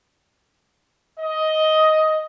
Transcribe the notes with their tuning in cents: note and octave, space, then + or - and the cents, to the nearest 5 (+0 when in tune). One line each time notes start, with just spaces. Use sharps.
D#5 +10